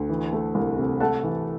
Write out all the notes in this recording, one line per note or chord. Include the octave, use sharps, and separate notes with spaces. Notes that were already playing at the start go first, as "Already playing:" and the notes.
Already playing: D2
E3
A3
C2
C3
A3 F#5 A5
E3